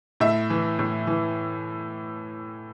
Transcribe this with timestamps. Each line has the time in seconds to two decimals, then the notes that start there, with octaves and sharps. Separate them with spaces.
0.20 A2 E5
0.50 E3
0.79 A2
1.07 E3